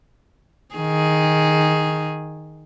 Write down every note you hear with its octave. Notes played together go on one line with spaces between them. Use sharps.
D#3 G#4